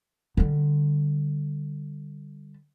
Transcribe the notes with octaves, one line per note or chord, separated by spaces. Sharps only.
D3 G3